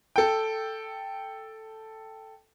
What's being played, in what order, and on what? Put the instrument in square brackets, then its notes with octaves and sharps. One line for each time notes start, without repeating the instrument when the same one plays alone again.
[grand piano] A4 G5